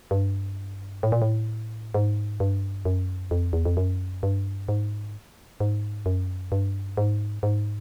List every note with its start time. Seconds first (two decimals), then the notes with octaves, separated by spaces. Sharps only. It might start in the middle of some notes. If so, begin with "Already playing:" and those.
0.11 G2
1.03 A2
1.12 A#2
1.22 A2
1.94 G#2
2.40 G2
2.85 F#2
3.31 F2
3.53 E2
3.65 F2
3.77 F#2
4.23 G2
4.69 G#2
5.60 G#2
6.06 F#2
6.52 G2
6.97 G#2
7.43 G#2